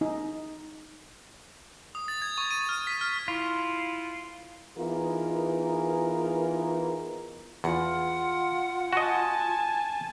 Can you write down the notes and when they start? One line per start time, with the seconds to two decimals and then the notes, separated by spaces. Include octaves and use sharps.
0.01 D#4
1.95 D#6
2.08 A6
2.22 G#6
2.38 C#6
2.51 D#7
2.69 F6
2.87 B6
3.01 F6
3.28 E4 F4
4.77 E3 B3 D#4 F4 G#4 A#4
7.64 E2 F4 F#5
8.93 F#4 D#5 G#5 A5